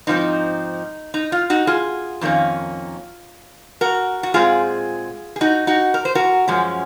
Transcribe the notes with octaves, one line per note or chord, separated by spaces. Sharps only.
G#2 F3 C4 D#4
D#4
F4
D#4 F#4
F4 G#4
F2 D#3 A#3 C#4
F#4 A#4
F#4
A#2 G#3 C4 F4 G#4
G#4
D#4 F#4
D#4 F#4
A#4
C5
F#4 A#4
F#2 F3 G#3 C#4